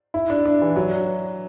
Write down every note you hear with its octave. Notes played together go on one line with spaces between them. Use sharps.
E4
D4
D4
E3
F#3